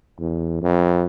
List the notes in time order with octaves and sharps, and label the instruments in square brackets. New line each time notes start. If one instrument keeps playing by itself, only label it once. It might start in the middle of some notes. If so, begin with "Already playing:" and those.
[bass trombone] E2
F2